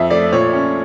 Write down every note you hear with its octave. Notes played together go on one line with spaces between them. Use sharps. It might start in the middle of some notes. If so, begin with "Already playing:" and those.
Already playing: F2 E5
A3 D5
A#2 C#5
C#4